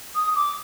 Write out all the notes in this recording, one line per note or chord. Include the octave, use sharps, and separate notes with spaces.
D#6
D6